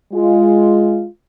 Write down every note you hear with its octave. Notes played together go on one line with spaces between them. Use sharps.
G#3 F4